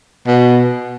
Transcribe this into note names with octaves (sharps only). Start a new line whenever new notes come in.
B2